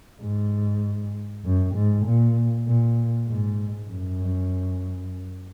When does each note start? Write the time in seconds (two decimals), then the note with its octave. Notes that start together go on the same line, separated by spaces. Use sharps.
0.21 G#2
1.44 F#2
1.74 G#2
2.05 A#2
2.66 A#2
3.28 G#2
3.89 F#2